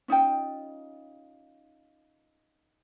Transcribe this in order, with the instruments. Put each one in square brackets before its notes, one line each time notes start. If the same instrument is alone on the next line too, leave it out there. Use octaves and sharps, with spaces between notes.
[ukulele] C#4 D#4 F4 G5